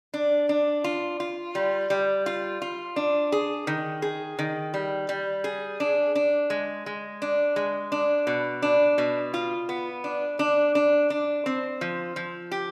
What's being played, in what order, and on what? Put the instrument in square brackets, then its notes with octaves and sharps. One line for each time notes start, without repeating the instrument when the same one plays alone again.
[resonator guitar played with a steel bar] D4
D4
F4
F4
G3
G3
F4
F4
D4
G#4
D#3
G#4
D#3
G3
G3
G#4
D4
D4
G#3
G#3
D4
G#3
D4
B2
D4
B2
F4
B3
D4
D4
D4
D4
C4
F3
F3
G4